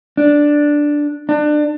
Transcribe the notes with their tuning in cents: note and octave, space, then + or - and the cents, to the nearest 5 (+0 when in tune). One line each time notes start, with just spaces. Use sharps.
D4 +0
D4 +25